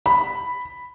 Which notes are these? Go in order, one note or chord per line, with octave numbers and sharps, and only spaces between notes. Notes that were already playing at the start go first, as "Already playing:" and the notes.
B5